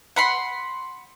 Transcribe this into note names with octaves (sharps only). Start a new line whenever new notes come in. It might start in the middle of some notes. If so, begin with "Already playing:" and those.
F#5 B5 C6